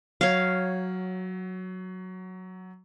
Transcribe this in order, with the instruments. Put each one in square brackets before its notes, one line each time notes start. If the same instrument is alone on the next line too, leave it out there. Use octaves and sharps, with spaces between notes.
[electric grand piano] F#3 [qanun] C#5 F5